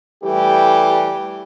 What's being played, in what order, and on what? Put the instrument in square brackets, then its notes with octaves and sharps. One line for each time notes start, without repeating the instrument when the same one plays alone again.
[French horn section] E3 G3 A3 G4